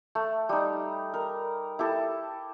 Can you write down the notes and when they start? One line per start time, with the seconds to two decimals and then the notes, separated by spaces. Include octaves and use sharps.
0.15 A3
0.49 G3 D#4
1.14 A#4
1.79 E4 G4 A4